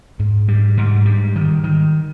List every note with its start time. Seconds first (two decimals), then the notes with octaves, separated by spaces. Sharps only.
0.19 G#2
0.48 G3
0.77 G#2
1.06 G3
1.36 D#3
1.64 D#3